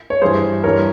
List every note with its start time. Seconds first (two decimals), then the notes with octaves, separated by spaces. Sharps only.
0.10 C#5
0.22 G2 E3 G#4 C5
0.64 G2 E3 A#4 C#5